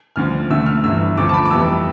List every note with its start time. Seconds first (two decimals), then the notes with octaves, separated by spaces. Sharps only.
0.16 D2 D3 F3 F6
0.50 D2 D3 A3 E6
0.66 F6
0.84 G1 G2 E3 E6
1.18 D2 D3 F3 A3 D6
1.29 A5
1.34 B5
1.45 D6
1.51 F2 E3 G3 B3 E6